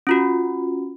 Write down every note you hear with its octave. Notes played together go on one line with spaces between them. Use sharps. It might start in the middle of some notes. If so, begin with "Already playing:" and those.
C#4 F4 F#4